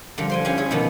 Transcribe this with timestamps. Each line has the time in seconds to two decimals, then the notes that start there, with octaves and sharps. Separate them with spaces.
0.18 D3 F3 G3
0.30 C5 G5 G#5
0.45 C#4 E4 G4 F5 G#5
0.57 E4 G#4 C#5 E5
0.71 B2 D3 D#3 F3 B3